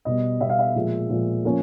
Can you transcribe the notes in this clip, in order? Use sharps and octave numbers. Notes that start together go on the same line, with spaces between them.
B2 G3 B3 D#5
B2 G3 B3 E5
F5
E5
A#2 F3 G#3
A#2 F3 G#3
F3 A#3 C#4